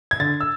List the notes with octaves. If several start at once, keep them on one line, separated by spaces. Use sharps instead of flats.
G#6
D3 A6
E6